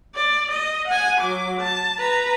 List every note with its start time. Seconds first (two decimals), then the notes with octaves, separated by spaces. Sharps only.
0.15 D5
0.51 D#5
0.88 F#5 G#5
1.21 F#3 D6
1.60 A5
1.99 B4 A#5